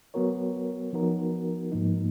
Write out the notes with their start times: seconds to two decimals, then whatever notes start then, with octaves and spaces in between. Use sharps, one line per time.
0.14 F#3 B3 F#4 A#4 C#5
0.93 F3 B3 D#4 F#4 A#4
1.72 G#2 F3 A#3 D#4